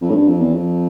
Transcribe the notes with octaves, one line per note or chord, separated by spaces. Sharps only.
F2
A2
G2
F2
E2
F2